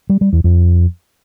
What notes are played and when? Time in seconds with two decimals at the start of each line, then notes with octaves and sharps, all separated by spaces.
0.09 G3
0.21 G3
0.33 E2
0.44 F2